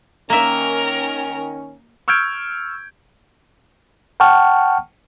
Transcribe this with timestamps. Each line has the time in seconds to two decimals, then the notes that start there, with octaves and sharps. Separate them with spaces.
0.30 D#3 A#3 C#4 A#4 E5
2.08 C#6 E6 F6 G6 G#6 D7
4.20 F#5 G5 A5 C#6 F6